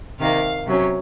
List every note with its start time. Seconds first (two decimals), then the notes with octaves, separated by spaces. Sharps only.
0.19 C3 D#3 A#3 F5
0.66 C3 F#3 C#4